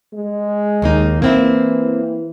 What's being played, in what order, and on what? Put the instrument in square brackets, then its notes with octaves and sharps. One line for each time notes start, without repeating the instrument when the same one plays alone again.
[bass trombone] G#3
[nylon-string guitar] D#2 A#3 D#4
[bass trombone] E3 [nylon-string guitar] A#3 C4 E4